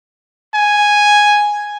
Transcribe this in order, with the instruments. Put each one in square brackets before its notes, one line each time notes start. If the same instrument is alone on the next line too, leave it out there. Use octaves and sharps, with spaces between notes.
[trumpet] G#5